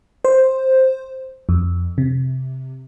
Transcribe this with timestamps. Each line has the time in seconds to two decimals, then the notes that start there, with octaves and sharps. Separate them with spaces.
0.25 C5
1.49 F2
1.98 C3